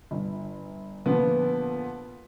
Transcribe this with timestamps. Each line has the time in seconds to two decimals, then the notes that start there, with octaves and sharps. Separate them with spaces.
0.11 G1
1.06 A#2 D3 F3 B3